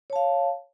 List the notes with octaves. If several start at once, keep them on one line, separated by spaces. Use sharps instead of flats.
C#5 F5 A5